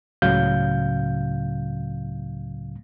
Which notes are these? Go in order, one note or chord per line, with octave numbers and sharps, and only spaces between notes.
C#2 A2 C#3 F#3 F5 G6